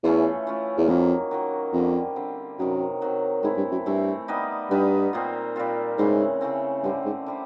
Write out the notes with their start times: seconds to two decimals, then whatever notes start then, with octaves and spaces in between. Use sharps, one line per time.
0.03 E2 E3 A3 C#4 F4
0.47 E3 A3 C#4 F4
0.78 E2
0.88 F2 D#3 F#3 A#3
1.31 D#3 F#3 A#3
1.73 F2 D3 G3 C4
2.16 D3 G3 C4
2.59 F#2 C3 D#3 F#3
3.02 C3 D#3 F#3
3.43 G#2 E3 A3 C4 E4
3.57 G2
3.72 F#2
3.86 G2 E3 A3 C4 E4
4.28 G3 B3 D#4
4.71 G2 G3 B3 D#4
5.13 A#2 G3 C4 F4
5.56 A#2 G3 C4 F4
5.98 G#2 C#3 E3 A3 C4
6.41 C#3 E3 A3 C4
6.84 G2 D3 G3 C4
7.05 G#2
7.26 D3 G3 C4